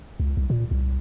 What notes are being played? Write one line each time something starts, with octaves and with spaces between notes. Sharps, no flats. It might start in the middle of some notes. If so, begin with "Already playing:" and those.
C#2
C2
A#2
C2